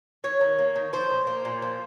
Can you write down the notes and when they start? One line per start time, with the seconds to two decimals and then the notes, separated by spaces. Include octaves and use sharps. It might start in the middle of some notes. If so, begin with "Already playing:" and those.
0.24 F#3 C#5
0.41 D#3
0.58 A#3
0.76 D#3
0.93 F3 C5
1.10 A#2
1.27 A#3
1.45 A#2
1.62 F3